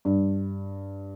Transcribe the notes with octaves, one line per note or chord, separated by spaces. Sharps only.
G2